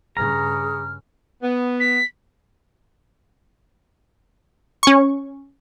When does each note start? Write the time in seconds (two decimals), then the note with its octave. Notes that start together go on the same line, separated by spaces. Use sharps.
0.17 G2 C#3 G#4 A#5 F6
1.42 B3
1.80 B6
4.83 C#4 C#6